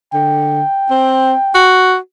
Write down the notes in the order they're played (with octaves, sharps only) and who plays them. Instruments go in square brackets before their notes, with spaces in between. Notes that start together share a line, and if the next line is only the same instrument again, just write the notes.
[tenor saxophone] D3 [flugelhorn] G5
[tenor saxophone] C4
F#4